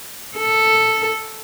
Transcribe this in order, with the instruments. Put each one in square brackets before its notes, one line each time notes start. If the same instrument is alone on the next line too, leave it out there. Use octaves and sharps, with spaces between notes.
[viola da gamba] A4